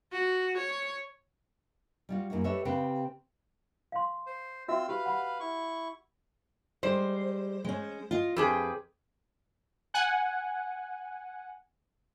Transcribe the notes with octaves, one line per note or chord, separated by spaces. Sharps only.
F#4
C#5
G3 F4 F#4
F#2 A#3 E4 F#4
G4 A4 B4 C#5 D#5 E5
C#3 C4 G4 B4 F5 G5
F5 C6
C5
C4 F4 F#4 E5 E6
G4 B4 F5
F#5 B5
E4 C#6
G3 G#3 C5
G#3 C#4
F4 D#5
F2 G4 G#4 B4
F#5 G#5